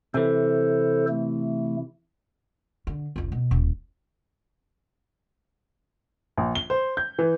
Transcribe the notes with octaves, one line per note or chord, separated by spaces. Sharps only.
C3 E3 A4 C5
A3
D3
F1 C#2
B2
D#1
A#1
G7
C5
G6
E3